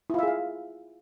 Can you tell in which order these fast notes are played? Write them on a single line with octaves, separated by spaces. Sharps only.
E4 F4 E5 G#4 F5